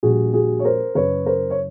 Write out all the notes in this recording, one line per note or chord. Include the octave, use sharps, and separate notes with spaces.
A#1 A#2 G3 F#4 G#4
F#4 G#4
C#5
A#4 C5
F#1 F#2 C#3 B4 C#5
A#4 C5
C#5